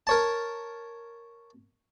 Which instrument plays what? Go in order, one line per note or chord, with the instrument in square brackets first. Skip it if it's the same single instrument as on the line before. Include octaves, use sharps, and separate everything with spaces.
[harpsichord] A#4 C#5 A5